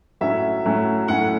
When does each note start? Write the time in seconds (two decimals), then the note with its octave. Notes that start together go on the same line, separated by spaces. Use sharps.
0.21 A2 F#3 A3 C#4 E5
0.65 A2 F#3 A3 C#4
1.08 A2 F#3 A3 C#4 F#5